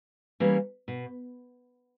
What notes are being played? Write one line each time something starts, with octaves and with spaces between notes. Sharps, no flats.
E3 G3 A#3 C#4
B2